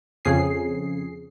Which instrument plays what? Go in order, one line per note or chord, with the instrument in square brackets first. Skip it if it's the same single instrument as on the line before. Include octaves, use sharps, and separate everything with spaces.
[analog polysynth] F2 C#3 G#4 C7